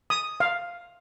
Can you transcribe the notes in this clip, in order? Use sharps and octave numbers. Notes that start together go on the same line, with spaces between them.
D#6
F5